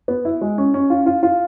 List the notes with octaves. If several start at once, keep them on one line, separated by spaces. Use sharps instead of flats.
B3
E4
G#3
C#4
C#4
F4
F4
F4